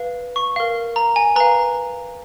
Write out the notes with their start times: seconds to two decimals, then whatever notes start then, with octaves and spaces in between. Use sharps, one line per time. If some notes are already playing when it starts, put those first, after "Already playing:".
Already playing: B4 F5
0.36 C#6
0.56 A#4 F5
0.96 A#5
1.16 G#5
1.36 B4 F5 A#5